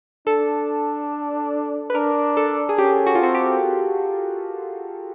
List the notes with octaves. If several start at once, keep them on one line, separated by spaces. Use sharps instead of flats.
D4 A4
B4
D4 A#4
A4
G#4
C#4 G4
F#4
F4
C4 F#4
G4